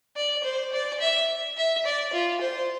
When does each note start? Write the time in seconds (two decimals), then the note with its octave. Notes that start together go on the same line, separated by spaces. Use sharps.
0.16 D5
0.43 C5
0.72 D5
1.00 E5
1.57 E5
1.85 D5
2.13 F4
2.41 C5